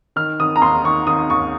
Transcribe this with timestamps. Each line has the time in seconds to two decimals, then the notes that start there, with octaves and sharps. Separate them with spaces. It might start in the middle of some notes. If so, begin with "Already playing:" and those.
0.16 D#3 F6
0.40 D#3 D#6
0.56 A#5
0.62 D#2 C6
0.84 D#3 C#6
1.07 D#3 D#6
1.30 D#2 C#6